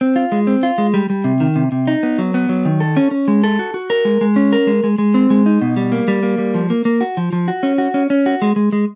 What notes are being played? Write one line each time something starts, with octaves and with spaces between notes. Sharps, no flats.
C4
F4
G#3
C4
F4
G#3
G3
G3
C3
D#3
C3
C3
D#4
B3
F#3
B3
F#3
D#3
A4
C#4
C#4
G#3
A4
F#4
F#4
A#4
G#3
G#3
C#4
A#4
G#3
G#3
G#3
C4
G#3
D#4
B2
G3
A#3
G3
A#3
G3
F3
A#3
A#3
F#4
F3
F3
F#4
C#4
F#4
C#4
C#4
F#4
G#3
G#3
G#3